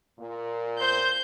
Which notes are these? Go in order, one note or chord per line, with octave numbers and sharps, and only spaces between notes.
A#2
C5 G6